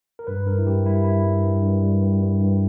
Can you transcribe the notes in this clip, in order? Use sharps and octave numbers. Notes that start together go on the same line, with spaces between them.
A#4
G2 B4
G2 A#4
E4
G2 G4
G3 E4
G2 E4
G2
G2
G2
G3
G2
G2
G2